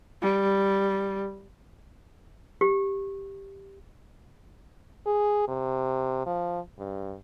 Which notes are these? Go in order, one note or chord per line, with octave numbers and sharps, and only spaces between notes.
G3
G4
G#4
C3
F3
G2